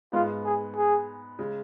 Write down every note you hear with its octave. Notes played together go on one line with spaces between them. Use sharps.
G#2 G#3 B3 F4
G#4
G#4
C#3 G#3